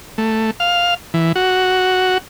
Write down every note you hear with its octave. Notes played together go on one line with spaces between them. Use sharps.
A3
F5
E3
F#4